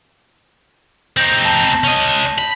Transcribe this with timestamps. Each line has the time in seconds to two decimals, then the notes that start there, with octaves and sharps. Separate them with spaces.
1.17 C4 D#4 G6 A#6
1.45 A5
1.84 C#4 D#5
2.38 B5